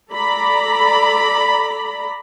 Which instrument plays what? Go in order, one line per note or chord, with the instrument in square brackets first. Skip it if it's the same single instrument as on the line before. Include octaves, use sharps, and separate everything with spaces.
[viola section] A4 D5 A#5 B5